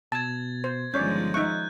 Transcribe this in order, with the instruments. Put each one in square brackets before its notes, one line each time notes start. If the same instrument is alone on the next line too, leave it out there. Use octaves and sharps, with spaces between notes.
[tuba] B2 [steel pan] A5 [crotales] G#6 A6
[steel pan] C5
[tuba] G1 [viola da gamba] D#3 F3 G#3 [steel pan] C#4 C#5 D5 [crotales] G6
[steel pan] D#4 E5 C#6 [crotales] F#6